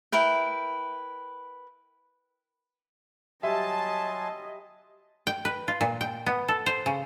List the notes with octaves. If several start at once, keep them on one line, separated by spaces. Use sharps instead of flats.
E4 A#4 B4 G5
F#3 G3 D#5 E5 G#5 A5 C6
G5
B4
F4
A#2
G5
B3
A4
C5
C#3